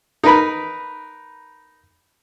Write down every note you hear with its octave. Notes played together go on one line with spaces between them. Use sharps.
D#4 A#4 B4 B5